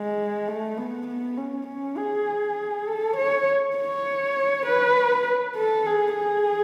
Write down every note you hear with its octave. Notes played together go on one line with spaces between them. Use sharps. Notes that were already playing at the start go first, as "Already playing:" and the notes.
Already playing: G#3
A3
B3
B3
C#4
C#4
G#4
A4
C#5
C#5
B4
A4
G#4
G#4